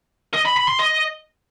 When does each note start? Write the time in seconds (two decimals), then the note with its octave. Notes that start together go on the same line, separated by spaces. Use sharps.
0.34 D#5
0.45 B5
0.57 B5
0.68 C6
0.79 D#5